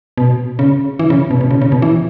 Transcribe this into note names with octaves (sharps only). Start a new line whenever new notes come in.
B2
C#3
E3
C#3
B2
B2
C#3
C#3
B2
E3